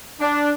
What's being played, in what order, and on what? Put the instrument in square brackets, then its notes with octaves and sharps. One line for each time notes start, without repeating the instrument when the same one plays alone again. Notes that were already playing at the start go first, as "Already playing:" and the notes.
[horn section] D4